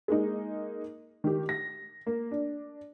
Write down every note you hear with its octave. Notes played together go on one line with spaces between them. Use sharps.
G#3 A#3 D#4
D#3 G4
A#6
A#3
D4